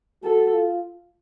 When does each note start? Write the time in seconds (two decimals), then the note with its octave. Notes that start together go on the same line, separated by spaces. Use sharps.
0.23 F#4 A4
0.53 F4